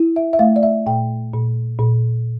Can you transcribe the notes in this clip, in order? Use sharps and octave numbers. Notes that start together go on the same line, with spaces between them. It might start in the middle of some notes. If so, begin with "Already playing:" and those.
Already playing: E4
E5
E5
A3 F5
D5
E5
A#2 G5
A#2
A#2